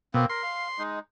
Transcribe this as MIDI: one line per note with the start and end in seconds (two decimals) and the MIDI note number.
0.14 0.25 47
0.14 0.26 58
0.14 0.26 60
0.29 0.42 70
0.29 0.83 84
0.43 0.68 77
0.78 0.99 56
0.78 0.99 63